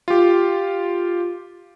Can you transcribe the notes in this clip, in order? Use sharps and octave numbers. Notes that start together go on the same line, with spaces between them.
F4 G4